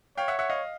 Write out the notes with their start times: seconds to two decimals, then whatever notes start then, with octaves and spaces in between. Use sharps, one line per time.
0.17 C#5 F5 G5
0.28 E5 F#5
0.39 E5 F#5
0.50 D#5 F5